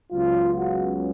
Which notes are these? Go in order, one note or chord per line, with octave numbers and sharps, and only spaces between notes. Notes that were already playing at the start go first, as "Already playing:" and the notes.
C#2 C#3 F#3 B3 F4
F#4